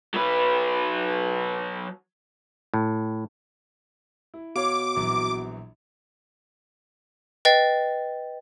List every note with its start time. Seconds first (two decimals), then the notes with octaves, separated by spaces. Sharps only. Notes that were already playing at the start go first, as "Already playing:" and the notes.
0.14 F#3 B4
2.74 A2
4.34 E4
4.56 B2 C#5 F5 D6
4.96 A#1 E3 F#3
7.45 B4 D#5 G5 A6 C7